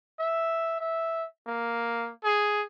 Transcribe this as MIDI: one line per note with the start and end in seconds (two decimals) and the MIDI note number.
0.19 0.78 76
0.80 1.26 76
1.47 2.11 58
2.24 2.63 68